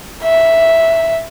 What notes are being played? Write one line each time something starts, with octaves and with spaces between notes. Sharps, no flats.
E5